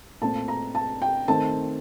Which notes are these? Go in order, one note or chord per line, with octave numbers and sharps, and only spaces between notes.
A#2 A3 C4 A5
A#5
A5
G5
D#3 A3 C4 A5